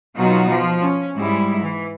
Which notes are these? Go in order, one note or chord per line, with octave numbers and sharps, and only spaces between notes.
B2 F#3 D#4 F4 F#4
F3
C#4
G#2 G3 G#3 E4
E3